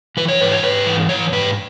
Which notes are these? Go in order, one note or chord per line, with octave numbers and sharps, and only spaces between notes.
E3 B4
C#5
G#2 B4
C#5
G#2 B4
E3
E3 C#5
G#2 B4